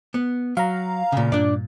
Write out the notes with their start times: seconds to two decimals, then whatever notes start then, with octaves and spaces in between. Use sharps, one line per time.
0.14 B3
0.57 F#3 F5 A#5
1.12 A#2 C#3
1.32 G2 A#2 D4 D5